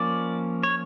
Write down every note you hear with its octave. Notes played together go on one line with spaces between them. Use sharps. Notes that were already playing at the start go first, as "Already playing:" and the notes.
Already playing: F3 A#3 C#4 D5
C#5